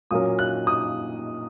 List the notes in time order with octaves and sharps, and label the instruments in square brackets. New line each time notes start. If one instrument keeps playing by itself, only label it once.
[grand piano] A#2 F#3 A#3 C#4 A#4 [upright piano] D#6
[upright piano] F#6
D#6